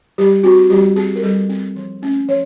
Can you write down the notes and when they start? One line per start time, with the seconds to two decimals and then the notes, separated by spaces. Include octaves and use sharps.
0.18 G3 G4
0.43 C4 F#4
0.70 G3 G4
0.96 C4 G#4
1.16 A#4
1.23 G3 A4
1.49 C4
1.76 F3
2.02 A3 C#4
2.28 F3 C#5